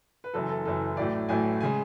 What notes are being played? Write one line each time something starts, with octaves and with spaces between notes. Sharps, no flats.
B4
F#1 F#2 E3 A4
A4
F#1 F#2 E3 A4
A1 A2 F#3 A3 D5
A1 A2 F#3 A3 G#5
C#3 G#3 G#5